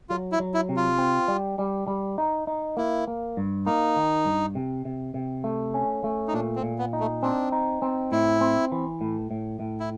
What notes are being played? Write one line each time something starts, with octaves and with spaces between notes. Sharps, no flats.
F#3 F4
E4
F#3
E4
C3
F4
C4
G3
G3
G3
D#4
D#4
A#3 E4
A#3
G2
A#3 D#4
D#3
G2
C3
C3
C3
A3
C#4
A3
D#4
A#2 D4
C4
A#2
B3
D#4
A3
C4 D4
D#4
C4
A2 E4
C4
E3
A2
A2
A2
E4